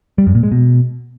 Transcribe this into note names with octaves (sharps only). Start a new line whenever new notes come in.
G3
F#2
A#2
G#3
B2